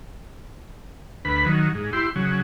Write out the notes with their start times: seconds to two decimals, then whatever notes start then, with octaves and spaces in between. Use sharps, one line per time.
1.25 D2 B4 B5
1.46 D#3 F#3
1.75 G#2
1.93 E4 G4 C6
2.16 C#3 F#3